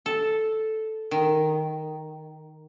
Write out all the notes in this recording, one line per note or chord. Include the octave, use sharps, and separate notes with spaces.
A4
D#3